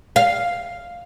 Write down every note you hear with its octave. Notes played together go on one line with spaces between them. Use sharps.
F5